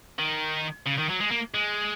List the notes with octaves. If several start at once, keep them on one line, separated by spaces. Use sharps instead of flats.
D#3
C#3
D#3
F#3
G#3
A#3
G#3